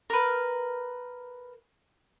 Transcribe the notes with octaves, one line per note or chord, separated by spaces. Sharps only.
A#4 B4